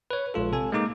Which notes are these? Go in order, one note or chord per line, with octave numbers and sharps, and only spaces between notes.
B4 C#5
A#1 G#3 F4 A4
C3 A4 G#5
G#3 A#3 D#4 D6